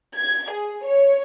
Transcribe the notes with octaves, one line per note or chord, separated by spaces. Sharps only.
G#6
G#4
C#5